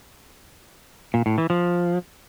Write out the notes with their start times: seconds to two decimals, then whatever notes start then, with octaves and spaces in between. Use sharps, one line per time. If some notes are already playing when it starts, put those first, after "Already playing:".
1.14 A#2
1.26 A2
1.38 E3
1.50 F3